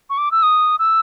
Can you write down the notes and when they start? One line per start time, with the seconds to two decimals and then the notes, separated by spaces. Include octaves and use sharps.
0.10 C#6
0.18 D6
0.31 E6
0.43 D#6
0.79 E6